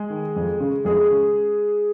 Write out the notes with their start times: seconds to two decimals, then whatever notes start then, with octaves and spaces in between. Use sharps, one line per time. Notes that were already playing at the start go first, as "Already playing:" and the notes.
Already playing: G#3 G#4
0.10 D#3
0.36 F2
0.60 C#3
0.85 F2 G#3 G#4
1.10 C#3